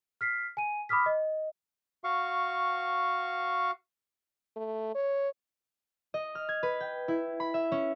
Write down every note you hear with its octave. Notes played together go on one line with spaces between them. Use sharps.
F6 B6 C7
G#5 D#7
B5 D6 D#6 F6 B6
D#5
F#4 F5 C#6
A3
C#5
D#5
F6
G#6
B4
G5
E4
B5
E5
C#4